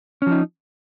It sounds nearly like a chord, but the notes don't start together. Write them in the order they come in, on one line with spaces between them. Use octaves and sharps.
C#4 F3 D#4